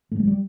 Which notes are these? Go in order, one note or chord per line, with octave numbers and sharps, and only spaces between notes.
A2 A3
G#3
G3